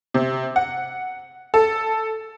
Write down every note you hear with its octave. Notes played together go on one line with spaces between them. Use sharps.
C3
F#5
A4